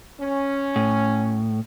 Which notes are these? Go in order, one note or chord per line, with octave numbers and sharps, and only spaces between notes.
C#4
A2